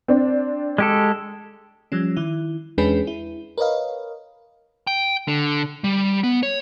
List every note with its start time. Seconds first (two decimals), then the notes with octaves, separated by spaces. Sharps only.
0.08 C4 D4
0.78 G#3 G4 A4
1.92 F3 G3 C#4
2.17 D#3 E4
2.78 E2 G#3 C#4 D4 G#4 B4
3.07 E4
3.58 A#4 B4 C#5 D#5 F5
4.87 G5
5.28 D3
5.84 G3
6.23 B3
6.43 C#5